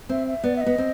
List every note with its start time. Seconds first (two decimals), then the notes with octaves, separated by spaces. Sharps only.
0.09 C4 E5
0.27 E5
0.44 B3 D5
0.56 E5
0.60 D#5
0.66 B3
0.78 C4